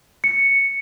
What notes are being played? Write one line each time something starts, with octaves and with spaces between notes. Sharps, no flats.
C#7